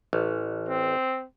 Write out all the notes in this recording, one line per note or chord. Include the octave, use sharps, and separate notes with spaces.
A1
C4